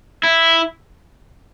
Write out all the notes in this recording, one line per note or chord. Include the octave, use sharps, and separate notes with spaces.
E4